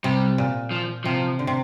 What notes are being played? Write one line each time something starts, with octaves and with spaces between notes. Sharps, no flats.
C3 G3
A#2
F3
C3 F3
D3
C3